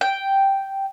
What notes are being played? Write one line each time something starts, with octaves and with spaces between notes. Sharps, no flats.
G5